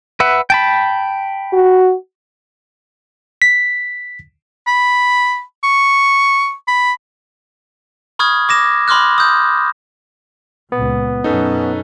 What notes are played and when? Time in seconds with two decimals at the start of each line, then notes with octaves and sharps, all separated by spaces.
0.20 B4 E5 F#5
0.50 G5 A5 B5
1.53 F#4
3.42 B6
4.67 B5
5.63 C#6
6.67 B5
8.19 B5 C#6 D#6 F6 G#6
8.49 D6 A#6 E7
8.88 B5 C6 D6 F6 F#6
9.18 D#6 G6
10.72 C#2 A#2 B3
11.24 F#2 B2 C#4 D#4 A4 B4